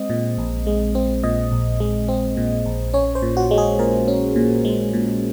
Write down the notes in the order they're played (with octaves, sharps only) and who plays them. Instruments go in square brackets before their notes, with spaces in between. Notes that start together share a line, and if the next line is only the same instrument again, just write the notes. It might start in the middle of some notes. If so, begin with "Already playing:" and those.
Already playing: [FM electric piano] G#3 C4 D#5
A#2
A#1
G#3
C4
A#2 D#5
A#1
G#3
C4
A#2
A#1
C#4 C#5
C5
A#2
F#4
G#3
G#4
A#2 A#4
C#4
A#2
G#3
A#2